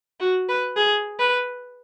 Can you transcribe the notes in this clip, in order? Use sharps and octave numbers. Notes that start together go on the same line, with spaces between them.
F#4
B4
G#4
B4